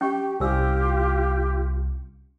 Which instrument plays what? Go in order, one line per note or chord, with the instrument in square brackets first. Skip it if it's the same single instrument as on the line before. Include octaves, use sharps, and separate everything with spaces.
[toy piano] C#4 G5 C#6 [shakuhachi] G4
[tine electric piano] C2 [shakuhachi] F4 [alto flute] G4 [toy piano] G#5 E6